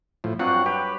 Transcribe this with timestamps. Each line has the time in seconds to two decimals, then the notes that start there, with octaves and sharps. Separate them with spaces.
0.24 A2 F3
0.39 G2 F#3 C4 F4 F#5
0.66 G4 B4